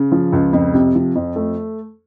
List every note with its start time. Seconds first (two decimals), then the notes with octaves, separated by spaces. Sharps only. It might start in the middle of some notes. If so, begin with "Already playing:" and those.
Already playing: C#3
0.12 F3
0.33 C#2
0.53 F2
0.74 C3
0.95 F3
1.15 F2
1.36 A3